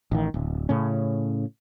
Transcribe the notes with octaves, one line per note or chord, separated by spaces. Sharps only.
A1 D#3
D1
A2 C#3 C#4